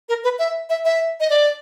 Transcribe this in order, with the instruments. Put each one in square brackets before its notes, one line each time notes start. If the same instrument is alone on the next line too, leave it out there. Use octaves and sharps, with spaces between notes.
[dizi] A#4
B4
E5
E5
E5
D#5
D5